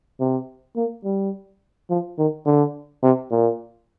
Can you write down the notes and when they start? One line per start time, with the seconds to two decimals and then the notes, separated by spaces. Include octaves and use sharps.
0.20 C3
0.76 A#3
1.04 G3
1.90 F3
2.18 D#3
2.46 D3
3.03 C3
3.31 A#2